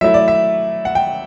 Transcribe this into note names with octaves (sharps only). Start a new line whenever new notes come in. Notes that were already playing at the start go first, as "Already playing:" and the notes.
F#3 A3 E4 E5
D5
E5
F#5
G5